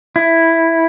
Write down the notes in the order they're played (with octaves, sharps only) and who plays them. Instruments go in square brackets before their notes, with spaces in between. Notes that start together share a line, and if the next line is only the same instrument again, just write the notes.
[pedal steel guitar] E4